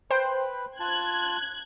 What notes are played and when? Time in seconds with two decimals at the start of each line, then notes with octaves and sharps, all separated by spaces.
0.11 B4 C5 G5 B5
0.80 F4 A5 F#6 G#6